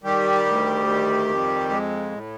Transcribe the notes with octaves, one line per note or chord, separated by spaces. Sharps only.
D#3 G3 G4
D2
D#3
F2
G#3
A2